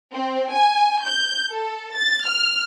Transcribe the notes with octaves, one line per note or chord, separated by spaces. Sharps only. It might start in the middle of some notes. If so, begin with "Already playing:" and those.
C4
G#5
G6
A4
A6
F6